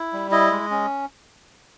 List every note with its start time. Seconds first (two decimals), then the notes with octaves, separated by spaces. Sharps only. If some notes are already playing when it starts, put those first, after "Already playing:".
Already playing: E4
0.13 G3
0.31 E4 D#5
0.51 G#3
0.71 C#4